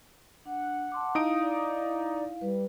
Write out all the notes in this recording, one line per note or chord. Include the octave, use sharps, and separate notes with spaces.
D4 F#5
A5 C6 D6
D#4 E4 F5 D#6 D7
D5
G3 B4